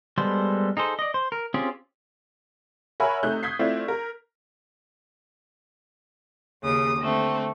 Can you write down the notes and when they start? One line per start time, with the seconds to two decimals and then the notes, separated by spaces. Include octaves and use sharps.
0.18 G3 G#3 B3 A4 C5
0.77 D#4 G#4 A4 C5
0.99 D5 D#5
1.14 C5
1.32 A#4
1.54 C4 C#4 F4 G4 G#4
3.00 A#4 C#5 E5 F#5 G#5 B5
3.23 C3 A3 D#4 F#6 G6
3.43 D#6 G6 G#6 B6 C7
3.59 A3 C4 E4 F4 D5
3.88 A#4
6.62 D#2 C#3 D#6
6.98 D3 A3 C4